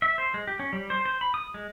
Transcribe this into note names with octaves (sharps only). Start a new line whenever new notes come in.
E5
C5
G#3
G4
C#4
G3
C5
C5
B5
D#6
G#3